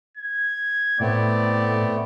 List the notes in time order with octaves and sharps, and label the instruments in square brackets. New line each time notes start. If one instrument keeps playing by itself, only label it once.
[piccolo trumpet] G#6
[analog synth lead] A2 [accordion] A3 B3 C4 [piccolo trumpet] D5